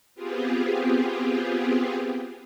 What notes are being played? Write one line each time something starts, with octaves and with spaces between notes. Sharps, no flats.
B3 C4 F4 G4 G#4